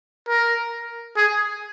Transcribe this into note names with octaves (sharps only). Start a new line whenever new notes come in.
A#4
G#4